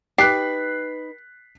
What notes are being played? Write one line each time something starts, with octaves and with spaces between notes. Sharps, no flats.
D#4 G4 B4 F#6 B6 C7